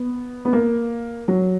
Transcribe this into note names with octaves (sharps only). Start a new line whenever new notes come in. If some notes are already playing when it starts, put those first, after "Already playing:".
Already playing: B3
B3
A#3
F#3